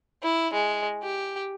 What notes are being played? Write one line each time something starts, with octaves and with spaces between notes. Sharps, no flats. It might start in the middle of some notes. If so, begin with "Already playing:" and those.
E4
G#3
G4